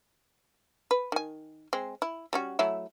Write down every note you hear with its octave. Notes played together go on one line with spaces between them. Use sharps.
B4
D#3 G#5
G#3 C4
E4
G3 C#4 F#4
F#3 A3 E4